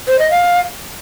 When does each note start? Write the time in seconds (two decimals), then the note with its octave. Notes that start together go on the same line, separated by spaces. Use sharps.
0.08 C5
0.19 D#5
0.30 F5